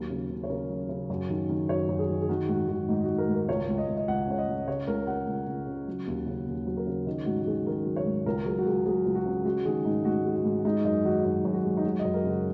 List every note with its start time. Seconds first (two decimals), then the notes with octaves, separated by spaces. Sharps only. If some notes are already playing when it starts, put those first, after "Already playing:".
Already playing: D#2 F#3
0.10 C#3
0.30 C#3
0.44 C#5
0.50 C#3 A#4
0.69 F#3
0.89 C#3
1.10 F#2
1.29 D#3
1.49 D#3
1.69 F#2 C#5
1.89 F#2
1.99 G#4
2.09 D#3
2.22 G#4
2.29 D#3 F#4
2.49 G#2 F#4
2.68 D#3 F#4
2.89 G#2 D#4
3.04 D#3 F#4
3.18 A#4
3.29 G#2 A#4
3.48 C#2 C#5
3.69 C#2
3.78 D#5
3.88 C#2
3.97 D#5
4.08 C#2 F#5
4.27 C#3 C#5
4.38 D#5
4.48 C#2
4.67 C#3 C#5
4.87 C#2 A#4
5.07 G#3 F#5
5.28 C#2
5.47 C#2
5.67 C#3
5.88 F#3
6.07 D#2
6.26 C#3
6.47 D#2
6.67 F#3
6.77 A#4
6.87 C#3
7.06 D#3 D#4
7.26 G#2 F#4
7.42 F#4
7.47 D#3 G#4
7.67 D#3 A#4
7.86 F#3
7.96 C#5
8.06 G#2
8.26 C#2 A#4
8.45 F#3 G#4
8.58 F#4
8.66 C#2 G#4
8.86 F#3 G#4
9.06 C#2
9.15 F#4
9.26 C#3
9.45 G#3 F#4
9.65 D#3 G#4
9.85 G#2 D#4
10.05 G#2 F#4
10.25 G#3
10.35 F#4
10.45 G#2
10.65 G#3 D#4
10.85 F#2 D#4
11.05 D#3 F#4
11.25 F#2 D#4
11.45 F#2
11.54 F#4
11.64 G#3
11.77 D#4
11.84 G#3 F#4
11.99 D#5
12.05 F#2
12.14 A#4
12.24 C#3
12.30 F#4